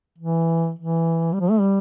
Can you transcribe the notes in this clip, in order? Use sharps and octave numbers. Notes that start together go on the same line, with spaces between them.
E3
E3
G3
F3
A3
G3